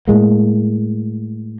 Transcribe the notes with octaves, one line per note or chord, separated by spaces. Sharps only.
A2 G#3 A#3